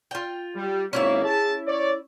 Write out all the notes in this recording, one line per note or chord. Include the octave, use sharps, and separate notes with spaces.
F4 G5
G3
G#1 A#3 C#4 E4 D5 E5
G#4 A5
C#5 D5